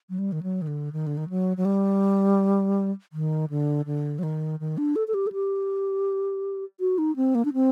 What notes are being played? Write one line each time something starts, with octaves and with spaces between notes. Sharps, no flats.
F#3
G3
D#3
F#3
D#3
D3
D#3
D3
D#3
F#3
F#3
G3
D#3
D3
D3
F#3
D#3
D#3
D4
A4
A4
G4
A4
G4
F#4
D#4
C4
A#3
D4
C4